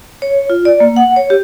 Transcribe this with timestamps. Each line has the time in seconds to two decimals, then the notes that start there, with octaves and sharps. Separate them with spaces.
0.22 C#5
0.50 F4
0.65 D5
0.80 A#3
0.96 F#5
1.16 C#5
1.30 G4